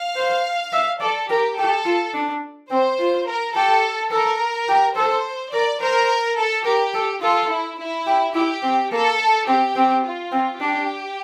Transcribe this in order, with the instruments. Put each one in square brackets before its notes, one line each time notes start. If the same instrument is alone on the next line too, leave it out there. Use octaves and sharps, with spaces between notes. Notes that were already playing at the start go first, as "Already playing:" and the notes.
Already playing: [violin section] F5
[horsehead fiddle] C5
E5
[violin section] A4 [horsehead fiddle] D5
[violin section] G4 [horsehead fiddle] A#4
[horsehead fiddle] G4 [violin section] A4
[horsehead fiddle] F4
D4
[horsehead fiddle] C4 [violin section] C5
[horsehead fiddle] F4
[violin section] A#4
[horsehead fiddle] G4 [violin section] A4
[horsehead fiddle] A4 [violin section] A#4
[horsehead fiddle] G4
[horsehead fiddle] A4 [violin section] C5
[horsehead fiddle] A#4 [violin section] D5
[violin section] A#4 [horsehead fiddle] C5
[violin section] A4
[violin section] G4 [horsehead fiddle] A#4
[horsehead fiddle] A4
[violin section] F4 [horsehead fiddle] A4
[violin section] E4
E4
[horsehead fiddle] G4
[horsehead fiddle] E4 [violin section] G4
[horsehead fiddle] C4
[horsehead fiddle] A#3 [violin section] A4
[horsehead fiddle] C4 [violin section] G4
[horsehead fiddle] C4
[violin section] F4
[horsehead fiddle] C4
[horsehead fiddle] D4 [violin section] G4